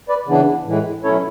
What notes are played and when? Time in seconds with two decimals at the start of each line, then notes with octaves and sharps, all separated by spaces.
0.08 B4 D5
0.27 C#3 E3 B3 D4
0.66 A2 E3 G#3
1.04 B2 F#3 A3 C#4 E4 A4 C#5